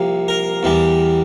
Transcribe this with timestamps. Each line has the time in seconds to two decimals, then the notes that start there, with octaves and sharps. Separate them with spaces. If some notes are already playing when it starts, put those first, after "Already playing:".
Already playing: C2 C3 F3 A#3
0.28 A#4
0.63 E2 E3 G3